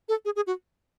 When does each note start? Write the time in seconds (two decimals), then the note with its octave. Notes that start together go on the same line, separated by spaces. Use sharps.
0.09 A4
0.25 G#4
0.36 G#4
0.47 F#4